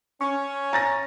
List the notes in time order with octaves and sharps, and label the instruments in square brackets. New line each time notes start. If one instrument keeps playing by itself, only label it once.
[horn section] C#4 [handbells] C#6
[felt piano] A#5 A6 A#6